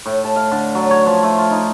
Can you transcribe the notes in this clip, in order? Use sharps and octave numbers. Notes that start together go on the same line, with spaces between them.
A2
A5
F5
D3
F#3
C#5
F3
A3
F4
D#4